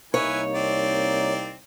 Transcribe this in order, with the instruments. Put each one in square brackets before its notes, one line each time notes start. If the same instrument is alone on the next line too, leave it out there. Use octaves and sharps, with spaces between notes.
[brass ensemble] C2 A#3 D#4 [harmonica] E4 B4 G#5 [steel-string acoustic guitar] C#5
[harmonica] C4 D5